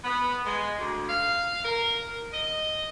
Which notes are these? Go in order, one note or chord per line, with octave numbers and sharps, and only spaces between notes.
B3
G#3
D2
F5
A#4
D#5